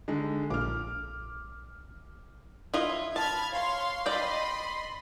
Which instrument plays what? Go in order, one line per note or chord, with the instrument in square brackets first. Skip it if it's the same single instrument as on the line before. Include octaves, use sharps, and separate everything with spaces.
[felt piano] D3 G#3 D#4
[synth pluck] A#1 [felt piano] D6 F6
[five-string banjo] E4 F4 D#5
[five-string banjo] A5 [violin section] B5 F6 G#6
[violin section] C#5 F5 C6
[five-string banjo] D5 G5 [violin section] D#5 B5 C6